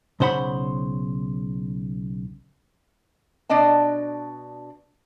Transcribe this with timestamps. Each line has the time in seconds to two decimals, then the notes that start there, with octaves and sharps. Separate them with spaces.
0.20 B1 C#3 C5 F#5 B5
3.49 B2 D4 D5 D#5 A5